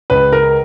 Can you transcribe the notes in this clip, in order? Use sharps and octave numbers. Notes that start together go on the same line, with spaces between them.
C#2 B4
A#4